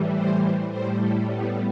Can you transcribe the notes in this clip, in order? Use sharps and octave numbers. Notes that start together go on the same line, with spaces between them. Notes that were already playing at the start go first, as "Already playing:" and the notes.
Already playing: A2 E3 G3
C5
A2 G3 C5
A4
B3